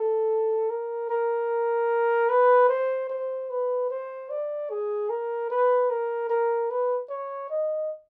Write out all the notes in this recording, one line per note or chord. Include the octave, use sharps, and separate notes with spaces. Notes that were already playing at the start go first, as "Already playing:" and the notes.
Already playing: A4
A#4
A#4
B4
C5
C5
B4
C5
D5
G#4
A#4
B4
A#4
A#4
B4
C#5
D#5